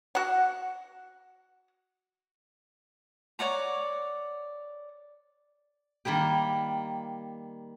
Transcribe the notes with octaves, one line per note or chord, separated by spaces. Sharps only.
F#4 F#5
C#5 D5 F#5 A#5
D#3 G3 A#3 G4